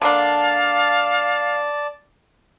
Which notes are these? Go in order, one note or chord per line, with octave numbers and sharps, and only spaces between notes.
D3 A#3 D4 D5 F5 A5